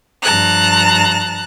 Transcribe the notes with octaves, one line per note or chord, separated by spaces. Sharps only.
G2 F3 A5 A#5 F#6